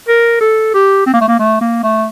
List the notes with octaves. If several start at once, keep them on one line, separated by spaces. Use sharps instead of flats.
A#4
A4
G4
C4
A#3
A3
A#3
A3
A#3
A3